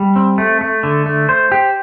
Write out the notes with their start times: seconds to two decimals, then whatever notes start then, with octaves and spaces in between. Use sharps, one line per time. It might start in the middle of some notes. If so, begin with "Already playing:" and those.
Already playing: G3
0.16 C4
0.38 A3
0.61 A3
0.83 D3
1.06 A3
1.29 C5
1.52 G4